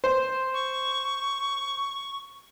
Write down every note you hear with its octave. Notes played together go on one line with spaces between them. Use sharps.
C5
C#6